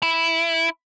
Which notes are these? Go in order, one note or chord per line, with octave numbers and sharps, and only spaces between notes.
E4